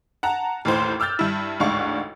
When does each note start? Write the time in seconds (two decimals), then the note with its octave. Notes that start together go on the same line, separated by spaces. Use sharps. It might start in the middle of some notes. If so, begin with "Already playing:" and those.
0.23 F#5 A5 A#5
0.65 A1 D#2 A2 C5
1.00 D6 E6 F6 G6 A6
1.19 G2 E4
1.60 A1 D2 G#2 D4 F5 C#6